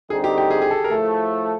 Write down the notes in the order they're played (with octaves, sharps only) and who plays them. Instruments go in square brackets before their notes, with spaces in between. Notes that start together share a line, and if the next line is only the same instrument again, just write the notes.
[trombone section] D3 G3 C4 D#4 [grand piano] G#4
[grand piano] G4
G4
G#4
G#4
A4
A#4
[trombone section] A2 F3 A3 [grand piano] A4